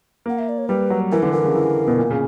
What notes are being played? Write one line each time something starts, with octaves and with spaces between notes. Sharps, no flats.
A#3 F#5
E5
D5
C#5
G3 B4
F#3
E3 A#4
D3 B4
E3 A#4
C#3
E3
B2
A#2
C#3